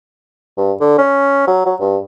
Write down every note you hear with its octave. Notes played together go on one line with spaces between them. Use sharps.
G2
D3
C#4
F#3
F#3
G2